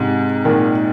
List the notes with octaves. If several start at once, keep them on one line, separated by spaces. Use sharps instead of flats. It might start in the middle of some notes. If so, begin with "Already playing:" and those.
Already playing: G#2 C3
A#2 D#3